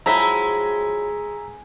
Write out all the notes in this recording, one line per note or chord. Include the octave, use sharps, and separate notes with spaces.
F3 F#3 G#3 E4 A#5 E6 B6